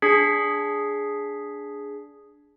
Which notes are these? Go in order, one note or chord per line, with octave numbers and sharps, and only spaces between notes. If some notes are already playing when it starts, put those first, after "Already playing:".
D4 G#4 G#6 B6 C7